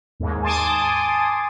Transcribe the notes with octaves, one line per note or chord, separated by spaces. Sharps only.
D#2 G#2
G#5 A5 C6 D6 D#6